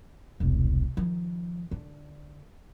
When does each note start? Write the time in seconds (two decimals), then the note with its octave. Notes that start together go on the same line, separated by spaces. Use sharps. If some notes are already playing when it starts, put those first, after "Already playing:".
0.40 E1 C2
0.97 D#3 F3
1.71 D3